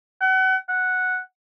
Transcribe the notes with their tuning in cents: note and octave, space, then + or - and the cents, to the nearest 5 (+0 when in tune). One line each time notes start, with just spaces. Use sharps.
F#5 +35
F#5 -5